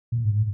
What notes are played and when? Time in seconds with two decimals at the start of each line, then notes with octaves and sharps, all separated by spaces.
0.12 A#2
0.25 G#2